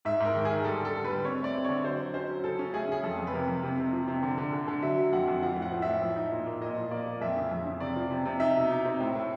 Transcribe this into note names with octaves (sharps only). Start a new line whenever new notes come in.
G#2 E5
G#2 A#4
D#3
D#3 G#4
G3 A4
D3
A4
D3
B4
G3
C4 C#5
A3 D5
C4
D3 C#5
F#3 C5
F#3
C#4 C5
F#3
C#3 A4
C#4
A3 G#4
C#3 G#4
F2 A4
F2
B4
C3 A#4
F2
C3
C3
F3
C3
D3
D3
D3
D3
F#3 E5
F#3
F2 F#5
F2
F3 F#5
A2
F#5
F3
A2 E5
F3
D#4
A#2
A#3
A#2 D#5
F3
A#3 D5
A#3
F2 E5
C#3
F2
C#3
C3 D5
F3
C3
C3
D#4 E5
B2
D#4
C4
A2
A2